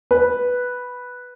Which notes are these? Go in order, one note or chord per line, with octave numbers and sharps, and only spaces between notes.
B4